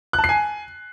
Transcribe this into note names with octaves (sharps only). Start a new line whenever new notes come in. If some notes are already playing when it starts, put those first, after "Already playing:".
F#6
A5
C7
G#5